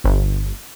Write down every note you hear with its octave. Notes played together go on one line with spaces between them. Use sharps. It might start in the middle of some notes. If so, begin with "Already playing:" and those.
G1